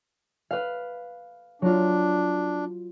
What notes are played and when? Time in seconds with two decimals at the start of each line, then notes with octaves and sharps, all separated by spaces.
0.51 B4 F5
1.62 F#3 D4 F4